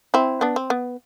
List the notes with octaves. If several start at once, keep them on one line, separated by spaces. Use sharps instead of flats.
C4 E4
B3 D4
C4
B3